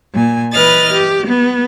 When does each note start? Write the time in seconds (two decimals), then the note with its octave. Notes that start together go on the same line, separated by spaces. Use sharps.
0.13 A#2 G#5
0.52 E3 B4 D#5 F6 A6
0.93 G4
1.27 B3